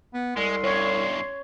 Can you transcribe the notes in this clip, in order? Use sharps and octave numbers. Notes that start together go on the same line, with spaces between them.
B3
C2 G#3 C6
E2 G2 C#5